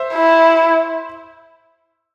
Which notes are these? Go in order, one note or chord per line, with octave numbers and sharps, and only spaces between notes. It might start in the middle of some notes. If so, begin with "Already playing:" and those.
Already playing: C5 E5
E4